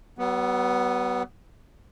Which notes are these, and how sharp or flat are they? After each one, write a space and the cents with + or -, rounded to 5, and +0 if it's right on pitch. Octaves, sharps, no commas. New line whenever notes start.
F#3 +45 B3 +0